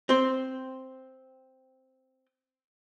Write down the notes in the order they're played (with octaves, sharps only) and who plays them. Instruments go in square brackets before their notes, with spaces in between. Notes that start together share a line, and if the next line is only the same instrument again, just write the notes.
[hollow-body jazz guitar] C4 C5